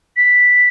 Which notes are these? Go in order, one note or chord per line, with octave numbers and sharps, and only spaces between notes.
B6